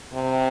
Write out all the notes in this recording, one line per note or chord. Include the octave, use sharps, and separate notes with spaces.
C3